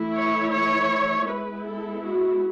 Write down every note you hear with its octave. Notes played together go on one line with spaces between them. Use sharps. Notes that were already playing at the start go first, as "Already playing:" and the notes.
Already playing: E3 A3 E4
C#5
C#5
G#3 B3 E4 B4
A4
F#4